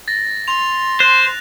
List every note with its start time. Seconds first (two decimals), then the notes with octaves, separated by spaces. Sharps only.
0.08 A6 A#6
0.48 C6 F7
1.00 C5 F#6